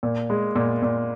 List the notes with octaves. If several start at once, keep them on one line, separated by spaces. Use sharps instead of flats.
A#2
G#3
A#2
A#2